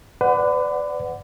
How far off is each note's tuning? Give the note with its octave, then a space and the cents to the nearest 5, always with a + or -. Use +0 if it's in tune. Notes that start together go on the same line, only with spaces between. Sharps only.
B4 +35 D5 +0 F#5 -5